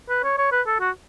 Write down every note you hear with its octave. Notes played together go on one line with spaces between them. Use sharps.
B4
C#5
C#5
B4
A4
F#4